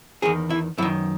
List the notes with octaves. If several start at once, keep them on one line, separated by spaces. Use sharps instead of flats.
E2 D#3 G#4
E4
F#2 D#3 E4